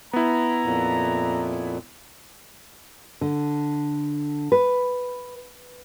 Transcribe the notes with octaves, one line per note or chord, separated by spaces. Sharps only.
B3 E4 A#5
F2 A#2
D3
B4